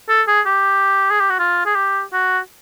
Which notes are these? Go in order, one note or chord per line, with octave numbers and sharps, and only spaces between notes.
A4
G#4
G4
G#4
G4
F#4
F4
G#4
G4
F#4